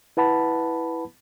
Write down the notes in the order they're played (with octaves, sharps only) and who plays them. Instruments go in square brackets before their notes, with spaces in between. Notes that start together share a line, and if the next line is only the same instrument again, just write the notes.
[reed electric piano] E4 B4 F#5 A5 B5